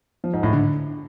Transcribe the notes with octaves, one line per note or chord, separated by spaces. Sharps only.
F3
G#2
A2
D3